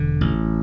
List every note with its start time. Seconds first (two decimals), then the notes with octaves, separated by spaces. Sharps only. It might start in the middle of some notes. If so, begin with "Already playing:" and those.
Already playing: E1 D3
0.21 A1